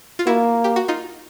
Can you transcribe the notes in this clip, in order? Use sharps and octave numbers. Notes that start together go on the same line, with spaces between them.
F4
A#3 E4 F#4
G4
F#4
D#4 F4